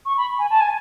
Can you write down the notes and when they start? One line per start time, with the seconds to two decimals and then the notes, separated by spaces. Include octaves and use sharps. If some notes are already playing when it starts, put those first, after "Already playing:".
0.06 C#6
0.17 B5
0.39 G#5
0.50 A5
0.61 G#5